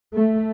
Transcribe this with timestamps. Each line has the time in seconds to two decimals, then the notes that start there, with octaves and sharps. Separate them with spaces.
0.14 A3